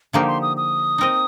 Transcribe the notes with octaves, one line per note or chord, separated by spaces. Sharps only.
D3 F3 A#3 D#4 G4 F5
C6
D#6
D#6
C4 D#4 A#4 D#5